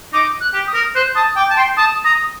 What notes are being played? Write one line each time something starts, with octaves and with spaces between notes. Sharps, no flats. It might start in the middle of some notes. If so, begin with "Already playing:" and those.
D#4 D6
F#6
G4
D#6
A#4
C5 F#6
A5 D#6
G5 D6
A5
G5 C6
A5 D#6
A#5 D#6